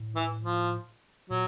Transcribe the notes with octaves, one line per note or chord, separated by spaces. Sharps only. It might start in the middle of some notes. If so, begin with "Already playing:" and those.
Already playing: A2
E3
F3
A#2 F#3